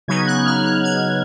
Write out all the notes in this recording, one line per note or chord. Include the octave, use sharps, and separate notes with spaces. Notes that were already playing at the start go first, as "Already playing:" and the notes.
C#3 F#3 B3 D#4 G#6
F#6
F6
F#6
G#6